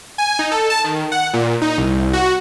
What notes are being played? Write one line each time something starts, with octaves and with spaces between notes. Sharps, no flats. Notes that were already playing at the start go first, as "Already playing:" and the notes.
G#5
D#4
A4
A5
D#3
F#5
A#2
D#4
C2
F#4